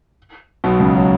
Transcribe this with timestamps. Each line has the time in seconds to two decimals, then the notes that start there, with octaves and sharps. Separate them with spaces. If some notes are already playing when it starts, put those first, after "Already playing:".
0.64 B1 B2
0.80 C#2 C#3
0.95 F#3